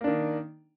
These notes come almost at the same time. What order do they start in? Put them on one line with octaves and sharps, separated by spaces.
A#3 D4 D#3